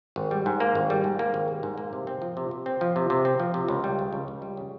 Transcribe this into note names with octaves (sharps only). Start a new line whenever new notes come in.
G#1
G3
G#2
A#3
G#1
G3
G#2
A#3
G#1
G3
G#2
A#3
C3
C4
F3
C3
C3
C4
F3
C3
C3
C4
F3
C3
C#2
G3
C#3
C#2
C#2
G3
C#3